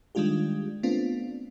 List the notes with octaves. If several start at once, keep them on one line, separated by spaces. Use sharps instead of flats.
D#3 G3 G#3 D4 F4 G4
A3 B3 C4 D4 F4